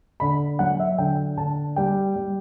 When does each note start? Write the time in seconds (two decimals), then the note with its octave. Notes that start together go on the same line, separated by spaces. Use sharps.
0.20 D3 B5
0.59 F#3 F#5
0.80 E5
0.98 D3 G5
1.37 D3 A5
1.76 G3 G5
2.16 G3